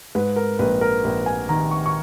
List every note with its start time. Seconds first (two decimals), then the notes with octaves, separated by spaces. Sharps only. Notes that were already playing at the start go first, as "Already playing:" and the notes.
0.15 G#2 B4
0.36 A#4
0.59 A#1 B4
0.81 A#4
1.04 A#1 B4
1.26 G#5
1.49 D#3 A#5
1.71 C#6
1.86 C#6